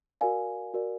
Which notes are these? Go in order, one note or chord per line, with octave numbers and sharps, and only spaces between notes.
F#4 A#4 D5 F5 G#5
F#4 A#4 D5